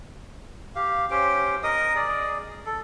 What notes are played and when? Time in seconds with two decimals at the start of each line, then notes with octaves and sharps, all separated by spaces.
0.75 G4 F5
1.11 C#4 G4 C5 G5
1.63 A#4 D#5 D#6
1.95 G#4 D5
2.66 A4